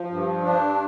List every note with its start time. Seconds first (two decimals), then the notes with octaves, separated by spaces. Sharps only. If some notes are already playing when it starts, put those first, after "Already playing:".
Already playing: F3
0.10 G2
0.44 D4